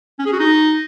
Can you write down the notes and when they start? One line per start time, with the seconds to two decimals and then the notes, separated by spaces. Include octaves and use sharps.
0.19 C#4
0.26 G#4
0.32 F#4
0.39 D#4